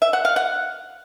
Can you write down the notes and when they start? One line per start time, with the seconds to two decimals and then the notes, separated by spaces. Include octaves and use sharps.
0.02 E5
0.13 F#5
0.25 F5
0.36 F#5